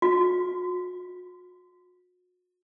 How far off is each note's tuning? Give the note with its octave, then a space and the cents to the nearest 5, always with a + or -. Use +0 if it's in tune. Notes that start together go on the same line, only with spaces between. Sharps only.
F#4 -40